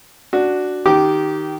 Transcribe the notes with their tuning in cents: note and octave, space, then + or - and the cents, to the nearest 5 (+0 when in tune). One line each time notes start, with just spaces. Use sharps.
D4 +0 F#4 +0
D#3 +0 G4 -20 D6 +0